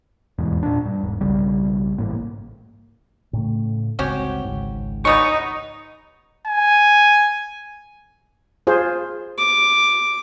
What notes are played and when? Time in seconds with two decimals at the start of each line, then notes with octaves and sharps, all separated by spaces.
0.39 F1 E2 G#2 B2
0.63 A#2 D4
0.86 G2
1.03 E1 G#2
1.21 B1 C#3 G3
1.98 A1 G#2 A#3
3.33 A2 C#3 A3
3.99 G1 C#2 C4 C#4 F#4 G4
4.44 G#1 C#2 G#2
5.05 G3 B3 C#4 D#4 C#6 D#6
6.47 G#5
8.67 F4 G#4 C5
9.38 D6